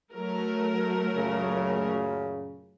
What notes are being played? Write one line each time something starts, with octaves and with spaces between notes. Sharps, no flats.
F#3 A3 A#4
F#2 A#2 C#3